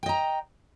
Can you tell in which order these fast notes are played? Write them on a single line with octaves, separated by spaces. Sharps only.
G5 D#5 A#5